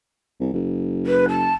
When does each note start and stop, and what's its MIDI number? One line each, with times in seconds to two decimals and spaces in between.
0.40 0.48 36
0.53 1.53 30
1.06 1.25 71
1.28 1.54 81